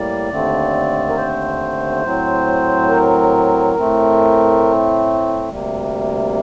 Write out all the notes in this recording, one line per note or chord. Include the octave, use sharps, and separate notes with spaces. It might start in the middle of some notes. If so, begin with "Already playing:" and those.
Already playing: A2 G3 A#3 D5
D#2 D3 A3 C4
A#4
C5
A2 F#3 C4
A#4
A2 A3 C4
D2 C3 G3 A#3